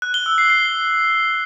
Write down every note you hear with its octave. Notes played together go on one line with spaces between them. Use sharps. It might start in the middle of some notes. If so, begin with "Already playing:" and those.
F#6
G7
E6
C7
C7